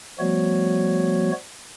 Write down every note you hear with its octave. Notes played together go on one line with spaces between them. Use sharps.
F3 G3 A3 B3 F#4 C#5